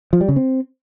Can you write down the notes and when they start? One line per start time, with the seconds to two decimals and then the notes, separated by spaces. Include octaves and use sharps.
0.13 F3
0.21 G3
0.29 C#3
0.36 C4